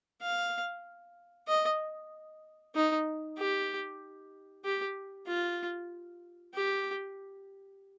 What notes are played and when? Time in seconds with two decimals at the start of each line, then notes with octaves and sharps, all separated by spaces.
0.22 F5
1.48 D#5
2.75 D#4
3.38 G4
4.64 G4
5.27 F4
6.54 G4